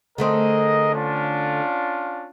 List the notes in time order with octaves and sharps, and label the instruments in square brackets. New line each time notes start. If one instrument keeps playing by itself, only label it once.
[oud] D3 A3 C4 [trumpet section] G#4 A#4 D#5
[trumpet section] C#4 D4 F4